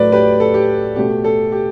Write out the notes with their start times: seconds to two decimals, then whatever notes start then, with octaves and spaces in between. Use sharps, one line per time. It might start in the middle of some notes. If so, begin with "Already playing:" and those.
Already playing: A2 F#3 A3 B4 D5
0.12 G4 B4
0.40 A4
0.54 G4
0.96 B2 A3 G4
1.24 A4
1.52 G4